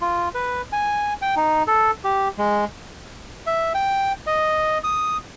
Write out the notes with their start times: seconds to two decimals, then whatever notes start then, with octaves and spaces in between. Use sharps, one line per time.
0.01 F4
0.35 B4
0.72 G#5
1.22 G5
1.37 D#4
1.67 A4
2.04 G4
2.38 G#3
3.47 E5
3.74 G5
4.27 D#5
4.84 D#6